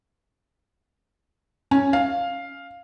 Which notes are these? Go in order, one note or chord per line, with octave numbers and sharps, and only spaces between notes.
C#4
F5